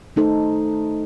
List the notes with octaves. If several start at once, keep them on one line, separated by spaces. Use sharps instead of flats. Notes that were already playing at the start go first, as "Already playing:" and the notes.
A3 D#4 A4 C5